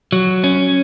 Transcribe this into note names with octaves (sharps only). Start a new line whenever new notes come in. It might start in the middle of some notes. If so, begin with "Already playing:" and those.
F#3
C#4